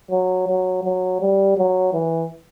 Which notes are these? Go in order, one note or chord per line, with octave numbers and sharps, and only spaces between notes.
F#3
F#3
F#3
G3
F#3
E3